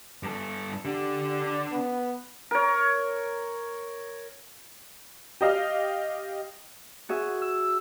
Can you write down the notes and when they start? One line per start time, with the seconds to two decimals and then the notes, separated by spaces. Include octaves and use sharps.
0.23 G2 A4
0.85 D3 D4 G4
1.72 B3
2.51 A#4 C#5
5.41 G4 D#5 F5
7.09 F#4 G#4 E5
7.42 E6